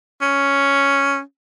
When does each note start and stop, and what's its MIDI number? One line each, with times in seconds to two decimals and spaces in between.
0.21 1.20 61